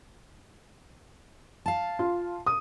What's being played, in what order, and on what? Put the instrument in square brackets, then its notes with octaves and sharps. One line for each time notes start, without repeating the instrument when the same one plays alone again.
[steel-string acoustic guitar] F5 A5
[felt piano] F4
D#6